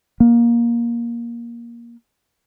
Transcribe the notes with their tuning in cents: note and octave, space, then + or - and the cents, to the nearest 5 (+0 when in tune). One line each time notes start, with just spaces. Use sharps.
A#3 +15